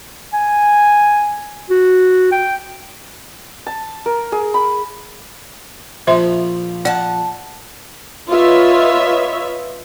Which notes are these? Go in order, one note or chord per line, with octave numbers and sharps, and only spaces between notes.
G#5
F#4
G5
A5
A#4
G#4
B5
A#1 F3 C5 E5 C6
D5 F#5 A5
F4 B4 C#5 D#5 E5